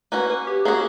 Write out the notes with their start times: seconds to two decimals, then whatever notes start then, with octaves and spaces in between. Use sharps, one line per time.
0.12 A#3 C#4 F#4 B4
0.30 B4
0.47 G4
0.65 A#3 C#4 F#4 G#4